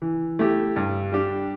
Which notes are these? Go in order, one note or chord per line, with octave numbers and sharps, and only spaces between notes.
E3
A3 E4 G4
G2
G3 D4 G4